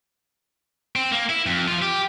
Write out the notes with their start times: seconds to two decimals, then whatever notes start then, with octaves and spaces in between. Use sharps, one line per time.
0.96 C4
1.12 A#3
1.30 E4
1.46 F2
1.68 F3 F4
1.82 G4